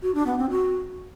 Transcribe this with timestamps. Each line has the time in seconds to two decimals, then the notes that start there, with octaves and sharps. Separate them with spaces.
0.03 F#4
0.15 D4
0.27 B3
0.38 C4
0.50 F#4